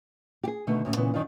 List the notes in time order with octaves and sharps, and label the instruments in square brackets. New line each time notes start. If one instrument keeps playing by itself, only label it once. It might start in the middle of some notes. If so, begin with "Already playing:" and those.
[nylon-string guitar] G4 G#4
B2 D3 D#3 A3 B3
D2 A2 C#4
A#2 C#3 E3 B3
F#2 D#3 D4 D#4 F4